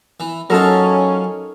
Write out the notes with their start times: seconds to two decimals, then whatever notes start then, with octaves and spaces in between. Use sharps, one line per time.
0.20 E3
0.50 F#3 C#4 D#4 F4 A4 A#4